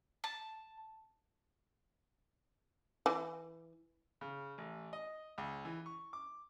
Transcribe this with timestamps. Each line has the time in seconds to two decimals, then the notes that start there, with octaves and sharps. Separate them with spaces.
0.24 A5
3.06 E3
4.21 C#3
4.58 A1
4.93 D#5
5.38 C#2
5.65 E3
5.86 C#6
6.13 D6